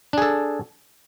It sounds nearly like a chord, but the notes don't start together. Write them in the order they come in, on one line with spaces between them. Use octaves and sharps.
D4 G#4 A4